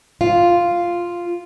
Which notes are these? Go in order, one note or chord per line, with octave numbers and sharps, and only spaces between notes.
F4